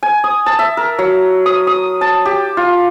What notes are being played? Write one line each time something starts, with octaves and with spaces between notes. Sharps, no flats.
G#5
D#6
A5
E5
A#4
F#3
D#6
D#6
A5
G4
F4